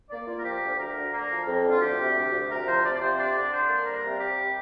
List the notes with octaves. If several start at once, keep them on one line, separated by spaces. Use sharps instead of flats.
A#3 D5
A#3 F4
A#4
F3 G4
D2
D2 A#4
D3
A#3 A#4
F3
F2
D3
F4
D2 G4
C3
D2
D2
C3 A#4
F3 C5
C3 D5
D5
C3 C5
D4 D5
D3
D4 C5
A#3
G3 A#4
C3
C3 G4
G3